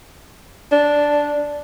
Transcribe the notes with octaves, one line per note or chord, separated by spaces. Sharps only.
D4